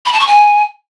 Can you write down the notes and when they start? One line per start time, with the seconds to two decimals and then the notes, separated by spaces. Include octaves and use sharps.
0.06 B5
0.13 A5
0.20 C#6
0.27 G#5